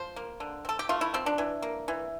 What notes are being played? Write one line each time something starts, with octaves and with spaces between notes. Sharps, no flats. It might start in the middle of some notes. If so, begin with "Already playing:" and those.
Already playing: F3 C5
A#3
D3
C4 A4
G4
A3 F4
E4
F3 C4
D4
E3
A#3
E3